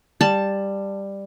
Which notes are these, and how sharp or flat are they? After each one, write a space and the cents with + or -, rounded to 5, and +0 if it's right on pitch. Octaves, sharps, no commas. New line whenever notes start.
G3 +10 A5 +5